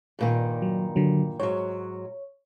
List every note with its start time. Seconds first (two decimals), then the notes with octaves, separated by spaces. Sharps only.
0.19 G2 A#2 D#3
0.62 F#3
0.96 D3 F#3
1.40 G#2 F#3 C#5